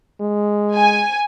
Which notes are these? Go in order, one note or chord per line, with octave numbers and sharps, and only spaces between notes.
G#3
G#5